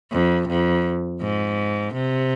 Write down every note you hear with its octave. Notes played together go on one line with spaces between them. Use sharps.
F2
F2
G#2
C3